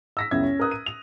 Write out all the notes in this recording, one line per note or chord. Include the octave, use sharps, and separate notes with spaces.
E6 A#6 B6
C#2 F#2 B3 E4 E6 G#6
C#4
A#4 B4 D#6 F#6
D#7
F7